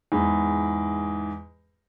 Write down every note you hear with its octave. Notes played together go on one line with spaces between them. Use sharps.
E2 G#2